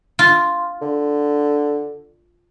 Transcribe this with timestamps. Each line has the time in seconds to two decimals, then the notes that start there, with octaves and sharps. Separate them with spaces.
0.19 F4
0.81 D3